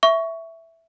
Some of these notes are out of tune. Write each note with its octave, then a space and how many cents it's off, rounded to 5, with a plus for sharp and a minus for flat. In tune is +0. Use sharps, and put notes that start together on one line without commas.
E5 +0 C#6 +15